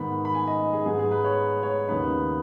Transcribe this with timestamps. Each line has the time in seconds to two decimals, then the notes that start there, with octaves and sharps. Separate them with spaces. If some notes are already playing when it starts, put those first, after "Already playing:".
Already playing: G#2 D#3 B3 D#4 B5
0.25 B5
0.35 G#5
0.48 D#5
0.73 G#4
0.86 G#2 G#3 B3 D#4 G#4
0.99 G#4
1.12 B4
1.24 C#5
1.63 C#5
1.88 D#2 C#3 B3 D#4 B4